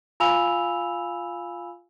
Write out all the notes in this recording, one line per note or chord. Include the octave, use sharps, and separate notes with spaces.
F4 F5 G#5 B5 E6 F7